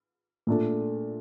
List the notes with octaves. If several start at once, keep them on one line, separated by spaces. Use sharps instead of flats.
A#2 A3 D4